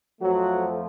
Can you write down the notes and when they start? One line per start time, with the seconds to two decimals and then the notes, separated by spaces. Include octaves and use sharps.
0.20 F2 F3 F#3 A3 F#4